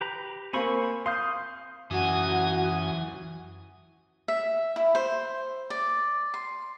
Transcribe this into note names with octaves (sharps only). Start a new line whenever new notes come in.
G4 B4 A#5
A#3 C4 G#5 B5 C#6
F5 C6 D#6 G6
F#2 E3 F#3 F#4 G#5 D#6
E5
E4
C5
D5
C6